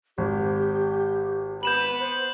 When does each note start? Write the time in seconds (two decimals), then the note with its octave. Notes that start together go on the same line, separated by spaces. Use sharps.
0.18 G#1 G4
1.63 B3 B4 G6 E7 F#7
2.00 C5